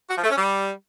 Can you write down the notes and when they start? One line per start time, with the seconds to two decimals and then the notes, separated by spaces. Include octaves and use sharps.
0.10 F#4
0.17 F3
0.23 A3
0.30 C#4
0.37 G3